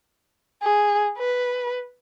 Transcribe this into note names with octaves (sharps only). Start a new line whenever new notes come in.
G#4
B4